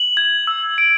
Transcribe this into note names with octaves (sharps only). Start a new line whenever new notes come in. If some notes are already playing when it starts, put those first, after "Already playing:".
Already playing: F#7
G#6
E6
D7